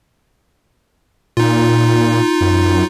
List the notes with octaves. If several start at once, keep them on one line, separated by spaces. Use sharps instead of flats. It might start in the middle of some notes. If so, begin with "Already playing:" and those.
A#2 D#4 F4
F#2